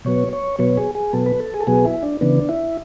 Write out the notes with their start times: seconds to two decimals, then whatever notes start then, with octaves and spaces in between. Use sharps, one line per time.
0.05 B2 F#3 B3 C#5
0.33 C#5
0.59 B2 F#3 B3 C#5
0.77 G#4
0.95 G#4
1.13 B2 F#3 B3 A4
1.26 B4
1.40 A4
1.54 G#4
1.61 A4
1.67 B2 F#3 B3 G#4
1.85 E4
2.03 D4
2.21 C#3 E3 B3 D4
2.49 E4